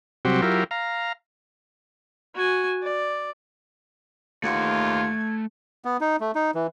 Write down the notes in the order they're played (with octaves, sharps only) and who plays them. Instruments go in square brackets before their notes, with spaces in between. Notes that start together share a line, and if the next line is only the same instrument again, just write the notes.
[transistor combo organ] C3 F#3 G3 C4 F#4 G4
F#3 E4 F4 G4 A#4
F5 A#5
[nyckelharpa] F#4 G#5
D5
[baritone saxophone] D#2 [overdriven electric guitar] A3 F#5 [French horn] F4 [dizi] G#6
[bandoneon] B3
D#4
A3
D#4
E3